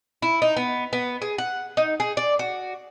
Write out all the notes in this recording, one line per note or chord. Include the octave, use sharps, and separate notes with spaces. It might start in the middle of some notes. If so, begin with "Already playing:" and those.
E4
D#4
B3
B3
G#4
F#5
D#4
G#4
D5
F#4